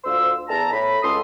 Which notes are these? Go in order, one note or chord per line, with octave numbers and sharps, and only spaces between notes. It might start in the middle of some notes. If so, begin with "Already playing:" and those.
D2 F4 C5 C6 E6
E2 A5 A#5
A2 B5
C#2 A4 C6 D#6